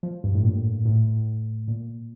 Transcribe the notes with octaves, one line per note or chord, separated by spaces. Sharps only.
F3
G2
A2
A#2
A2
A#2